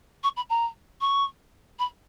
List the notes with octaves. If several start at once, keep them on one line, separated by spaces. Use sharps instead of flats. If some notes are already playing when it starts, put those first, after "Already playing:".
C#6
B5
A#5
C#6
B5